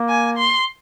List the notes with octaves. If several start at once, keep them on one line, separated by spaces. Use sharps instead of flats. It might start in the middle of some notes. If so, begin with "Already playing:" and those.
Already playing: A#3
G#5
C6